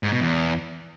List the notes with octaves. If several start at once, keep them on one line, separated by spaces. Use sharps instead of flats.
G#2
B2
E2